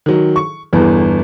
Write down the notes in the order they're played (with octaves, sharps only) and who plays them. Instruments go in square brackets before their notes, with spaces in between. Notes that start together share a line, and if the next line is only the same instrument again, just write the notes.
[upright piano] D#3 F#3
C#6
G1 E2 B3